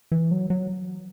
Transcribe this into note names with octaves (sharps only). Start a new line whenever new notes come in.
E3
F#3
F#3